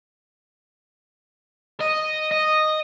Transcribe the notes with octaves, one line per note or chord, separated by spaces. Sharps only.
D#5
D#5